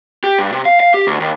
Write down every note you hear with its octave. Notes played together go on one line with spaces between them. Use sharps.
G4
G2
C3
F5
F5
G4
D2
D#2